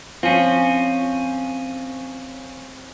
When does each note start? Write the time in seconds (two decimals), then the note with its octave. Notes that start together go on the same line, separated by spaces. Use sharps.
0.23 F3 C4 C#4